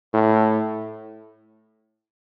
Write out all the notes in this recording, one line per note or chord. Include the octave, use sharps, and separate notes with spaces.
A2